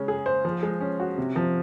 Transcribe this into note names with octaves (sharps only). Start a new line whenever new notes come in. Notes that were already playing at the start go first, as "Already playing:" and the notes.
Already playing: C#3 G#3 C#4
G#4
C5
F3
G#3
C#4
F#4
C3
F3